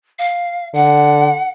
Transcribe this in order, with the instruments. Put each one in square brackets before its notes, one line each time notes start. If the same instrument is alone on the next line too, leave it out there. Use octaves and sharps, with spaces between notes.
[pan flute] F5
[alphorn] D3 [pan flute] F#5